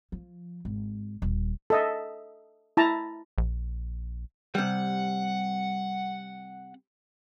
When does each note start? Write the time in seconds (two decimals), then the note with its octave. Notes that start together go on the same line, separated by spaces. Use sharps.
0.12 F3
0.65 G#1
1.22 D#1
1.70 A4 D#5 E5
2.77 E4 A5 A#5
3.38 A#1
4.55 C3 G3 F#5